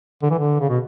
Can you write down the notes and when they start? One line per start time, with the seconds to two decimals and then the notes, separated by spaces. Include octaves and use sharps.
0.22 D3
0.31 E3
0.39 D3
0.61 C#3
0.69 B2